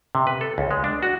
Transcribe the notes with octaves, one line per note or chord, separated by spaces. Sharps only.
C3
B4
A4
C#2
G#3
D4
F#4